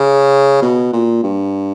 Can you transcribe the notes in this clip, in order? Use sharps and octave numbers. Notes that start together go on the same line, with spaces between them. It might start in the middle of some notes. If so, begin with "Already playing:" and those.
Already playing: C#3
B2
A#2
G2